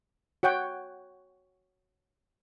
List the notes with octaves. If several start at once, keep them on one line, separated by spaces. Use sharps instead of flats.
F#4 C#5 F#5 G5